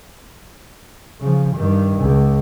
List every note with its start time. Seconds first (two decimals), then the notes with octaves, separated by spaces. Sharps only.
1.20 C#3 F3
1.55 G2 D#3
2.00 C#2